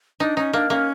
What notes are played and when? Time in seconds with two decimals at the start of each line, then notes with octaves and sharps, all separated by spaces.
0.20 D4 D#4
0.37 C#4 D#4
0.53 A#3 D4
0.69 A#3 C#4